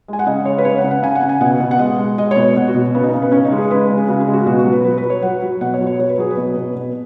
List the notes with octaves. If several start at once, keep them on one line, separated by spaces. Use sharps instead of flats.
G#3 G#5
F#5
C#3 D#5
G#3 C#5
B4
C#3 C#5
F#5
C#3
F#5
C#3 G#5
F#5
C#3
G#5
B2 F#5
B2
F#5
G#3 D#5
G#3
G#3 D#5
C#5
B2
B2 F#5
F#4
B2
C#3 B3
D#4
C#3
B3
C#3 C#4
D#4
G#3
G#4
G#3 B4
C#3
G#4
C#3 F#4
G#4
G#3
F#4
B2 F#4
F#4
F#3
B4
F#3 B4
B4
F#3
C#5
F#3 F#5
F#3
B2 F#5
C#5
F#3
C#5
F#3 C#5
B4
F#3 G#4
B4
B2
B2
B2